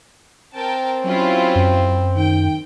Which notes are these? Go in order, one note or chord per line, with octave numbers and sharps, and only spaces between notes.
C4 A#4 G5 A5
F#3 C#4 E4 F4
F#2
D#3 G5